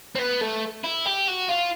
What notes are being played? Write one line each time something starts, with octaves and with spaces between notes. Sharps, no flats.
C4
B3
A3
E4
G4
F#4
F4